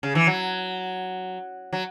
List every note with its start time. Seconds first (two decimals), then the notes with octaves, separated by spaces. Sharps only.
0.03 C#3
0.15 E3
0.27 F#3
1.73 F#3